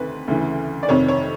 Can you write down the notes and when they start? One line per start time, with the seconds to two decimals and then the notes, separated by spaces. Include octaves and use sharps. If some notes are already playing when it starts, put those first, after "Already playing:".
Already playing: D2 C3 D#3 B4
0.28 D2 C#3 E3
0.83 D5
0.88 F2 C3 D#3 C#5
1.08 C#5